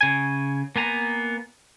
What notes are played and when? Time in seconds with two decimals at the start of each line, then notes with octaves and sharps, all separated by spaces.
0.01 C#3 G#5
0.76 A#3 B3 G#5 A#5